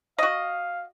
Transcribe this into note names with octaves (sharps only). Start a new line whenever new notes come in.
F#4 D#5 F5